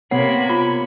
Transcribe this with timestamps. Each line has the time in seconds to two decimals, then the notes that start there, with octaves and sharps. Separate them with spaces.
0.11 C3 A#3 B3 C#5 F#5 B5 G#6
0.50 F4